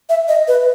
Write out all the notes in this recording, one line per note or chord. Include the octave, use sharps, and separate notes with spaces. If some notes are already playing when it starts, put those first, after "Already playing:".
E5
D#5
B4